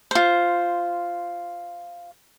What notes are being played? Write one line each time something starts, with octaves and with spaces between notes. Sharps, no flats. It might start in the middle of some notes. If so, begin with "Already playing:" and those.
F4 C5